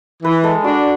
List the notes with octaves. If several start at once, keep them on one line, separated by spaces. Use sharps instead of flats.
E3 B4
G#3 A4
D4 F#4